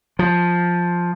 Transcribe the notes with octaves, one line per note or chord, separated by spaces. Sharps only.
F3